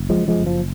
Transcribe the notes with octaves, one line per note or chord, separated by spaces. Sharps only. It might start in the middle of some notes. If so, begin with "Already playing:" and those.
Already playing: F#1
F3 G#3
F#2
F3 G#3
F#1
F3